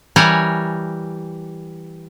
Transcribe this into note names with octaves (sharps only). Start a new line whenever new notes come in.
E3 G3 A#4 C#5 G#5